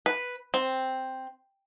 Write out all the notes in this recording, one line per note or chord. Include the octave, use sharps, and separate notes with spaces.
B4
C4